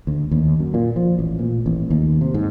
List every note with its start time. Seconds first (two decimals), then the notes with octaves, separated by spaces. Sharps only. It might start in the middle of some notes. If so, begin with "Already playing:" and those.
0.07 D2
0.31 D#2
0.59 F#2
0.74 A#2
0.96 F3
1.19 A1
1.39 A#2
1.66 A1
1.90 D#2
2.21 C3
2.34 G#2